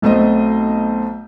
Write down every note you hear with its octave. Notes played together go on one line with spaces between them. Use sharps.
B1 A3 C4 D#5